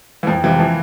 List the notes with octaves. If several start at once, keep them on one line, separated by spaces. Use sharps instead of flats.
E3
F2 F3
C3 E3 F3
E3 F3